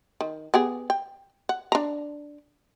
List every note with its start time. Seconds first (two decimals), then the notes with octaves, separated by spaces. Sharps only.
0.21 D#3
0.54 B3 G4 G#4
0.90 G5
1.49 F#5
1.72 D4 A#5